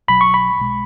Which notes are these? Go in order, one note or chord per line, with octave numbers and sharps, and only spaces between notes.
B1 B2 F#3 B5
C#6
B5
B1 B2 G#3